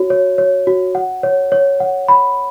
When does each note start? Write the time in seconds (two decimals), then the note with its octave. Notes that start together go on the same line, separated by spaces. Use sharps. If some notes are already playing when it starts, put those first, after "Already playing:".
Already playing: F#4 C#5
0.10 C#5
0.38 C#5
0.67 F#4
0.95 F#5
1.23 C#5
1.52 C#5
1.80 F#5
2.08 B5